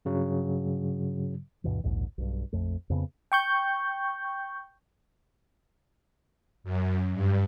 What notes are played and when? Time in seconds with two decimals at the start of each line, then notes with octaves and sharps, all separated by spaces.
0.05 G2 C#3 F#3
1.64 D2 G2 B2 E3
1.84 A#1 D#2 G#2
2.18 B1 G2
2.53 A#1 F2 A3
2.90 F2 C#3 B3
3.32 G5 C#6 G6
6.64 F#2
7.13 G2